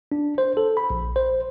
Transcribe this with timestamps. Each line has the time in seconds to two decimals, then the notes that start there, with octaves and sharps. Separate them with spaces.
0.12 D4
0.38 C5
0.57 A4
0.77 B5
0.90 A#1
1.16 C5